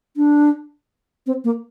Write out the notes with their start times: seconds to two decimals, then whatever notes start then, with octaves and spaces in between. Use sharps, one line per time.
0.17 D4
1.27 C4
1.44 A#3